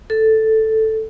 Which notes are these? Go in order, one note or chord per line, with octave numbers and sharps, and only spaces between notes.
A4